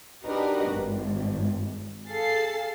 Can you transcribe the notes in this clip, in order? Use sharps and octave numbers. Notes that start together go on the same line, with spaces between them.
D4 D#4 F#4 G4 A#4 B4
G#1 G2
G#4 A4 F5 A6 C7